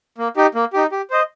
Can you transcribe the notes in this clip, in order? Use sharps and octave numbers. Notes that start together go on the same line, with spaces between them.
A#3
D#4 G4
A#3
D#4 G4
G4
C5 D#5